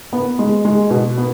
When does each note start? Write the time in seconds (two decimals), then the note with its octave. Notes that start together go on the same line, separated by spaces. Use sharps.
0.13 B3
0.39 G#3
0.65 G#3
0.90 B2
1.18 B3